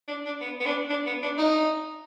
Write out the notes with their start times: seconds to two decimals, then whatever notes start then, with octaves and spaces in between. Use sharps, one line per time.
0.08 D4
0.25 D4
0.41 B3
0.60 B3
0.66 D4
0.90 D4
1.06 B3
1.23 D4
1.38 D#4